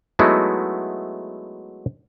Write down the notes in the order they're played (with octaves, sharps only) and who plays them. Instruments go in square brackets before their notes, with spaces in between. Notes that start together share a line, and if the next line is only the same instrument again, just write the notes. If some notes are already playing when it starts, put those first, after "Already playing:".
[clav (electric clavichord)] F#3 G#3 A3 B3 D#4 E4